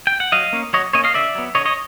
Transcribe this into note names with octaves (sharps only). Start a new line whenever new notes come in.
G5
F#5
F#3 D#5 F5
A#3 C#4
F#3 C#5 D#5
A#3 C#4 C#5 D#5
D#5 F5
D3 D5 E5
F#3 B3
D3 C#5 D#5
C#5 D#5